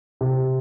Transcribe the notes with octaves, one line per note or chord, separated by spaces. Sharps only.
C3